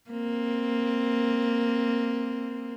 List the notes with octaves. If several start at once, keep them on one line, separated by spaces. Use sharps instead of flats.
A#3 C4